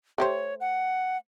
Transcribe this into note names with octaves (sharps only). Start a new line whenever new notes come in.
A3 G4 C5 C#5
F#5